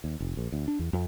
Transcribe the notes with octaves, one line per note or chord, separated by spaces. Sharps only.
D#2
F1
A#1
D2
D4
E2
F2